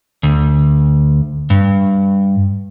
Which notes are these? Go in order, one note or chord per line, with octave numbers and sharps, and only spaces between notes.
D2
G2